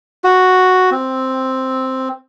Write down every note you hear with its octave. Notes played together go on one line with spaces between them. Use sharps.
F#4
C4